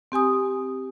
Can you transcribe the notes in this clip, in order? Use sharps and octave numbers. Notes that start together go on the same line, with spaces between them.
C4 G4 G#5 D#6